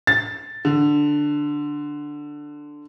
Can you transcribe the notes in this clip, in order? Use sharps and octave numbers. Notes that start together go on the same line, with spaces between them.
A6
D3